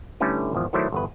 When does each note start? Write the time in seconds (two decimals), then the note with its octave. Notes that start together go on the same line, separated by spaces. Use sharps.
0.20 D3 G3 A3 C#4 E4 B4
0.53 G#1 E2 F3
0.73 D#3 F#3 A3 E4 C5 D5
0.92 G1 E2 B4